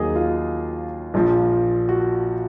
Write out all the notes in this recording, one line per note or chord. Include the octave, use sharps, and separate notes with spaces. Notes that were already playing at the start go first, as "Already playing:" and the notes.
Already playing: D#2 D#3 F#3 G#4 D#5
F4
A#1 A#2 F3
F#4